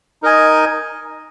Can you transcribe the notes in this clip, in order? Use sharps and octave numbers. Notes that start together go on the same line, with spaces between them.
D#4 A#4 D#5 G#5